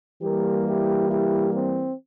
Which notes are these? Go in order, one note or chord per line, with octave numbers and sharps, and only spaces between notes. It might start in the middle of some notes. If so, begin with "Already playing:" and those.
E3 G3 A#3 G4 A#4
E4 G4
E4 G4
C4